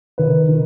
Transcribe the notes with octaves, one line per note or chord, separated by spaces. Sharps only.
D#3 B4
D#3